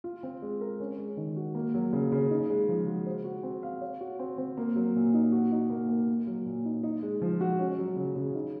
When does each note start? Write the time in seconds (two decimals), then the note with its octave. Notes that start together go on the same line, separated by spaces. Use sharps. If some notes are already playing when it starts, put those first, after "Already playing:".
0.04 F4
0.23 C4
0.42 G#3
0.61 A#4
0.80 C#4
0.98 G#3
1.17 D#3
1.37 F#4
1.55 A#3
1.74 F#3
1.93 C#3
2.12 C#3
2.30 D#4
2.50 G#3
2.68 F3
2.87 F#4
3.06 C5
3.24 F#4
3.43 C4
3.63 F5
3.81 C#5
4.01 F#4
4.19 C4
4.38 C4
4.57 A#3
4.76 F#3
4.95 A#2
5.14 D#4
5.32 F#4
5.51 D#4
5.70 A#3
5.89 A#3
6.08 A#3
6.27 F#3
6.46 A#2
6.65 D#4
6.83 D#4
7.03 G#3
7.22 F3
7.41 F#4
7.59 C#4
7.78 F#3
7.96 C#3
8.16 C#3
8.35 D#4